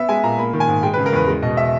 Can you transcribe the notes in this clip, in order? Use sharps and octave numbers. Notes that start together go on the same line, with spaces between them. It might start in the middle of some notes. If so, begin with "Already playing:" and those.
Already playing: B3 E5
G#3 G#5
A#2 A#5
A#3 B5
D#3
G#5
G#2
G#3 G5
C#3 B4
A#4
E2 B4
G#3
B2 D#5
E5